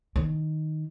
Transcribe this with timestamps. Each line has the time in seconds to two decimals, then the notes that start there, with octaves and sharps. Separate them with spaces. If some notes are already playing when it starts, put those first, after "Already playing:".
0.16 D#3